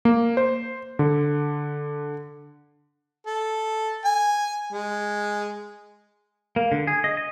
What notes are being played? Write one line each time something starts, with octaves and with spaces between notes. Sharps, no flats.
A#3
C5
D3
A4
G#5
G#3
A#3
D3
G#4
D#5
D#5